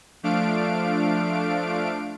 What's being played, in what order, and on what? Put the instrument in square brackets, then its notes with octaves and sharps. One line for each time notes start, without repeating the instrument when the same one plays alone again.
[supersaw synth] F3 A3 D4 F5 D7